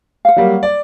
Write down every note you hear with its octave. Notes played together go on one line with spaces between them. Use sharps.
F5 F#5
F#3 G3 A#3
D5